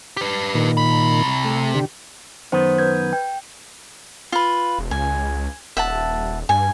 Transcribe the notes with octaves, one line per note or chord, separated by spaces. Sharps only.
G4 B4
A#2 D#3
C3 B5
A3
D3 G4
F#2 D#3 B3 C5
B4 G6 G#6
G5
F4 B4
E1
C#2 G#5
D#1 E5 F#5 A5
G2 G#5